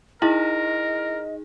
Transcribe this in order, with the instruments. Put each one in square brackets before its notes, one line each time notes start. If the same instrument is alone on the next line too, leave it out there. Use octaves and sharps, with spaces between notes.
[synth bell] D#4 G#4 [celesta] E4 [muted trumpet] A#4 [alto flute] D#5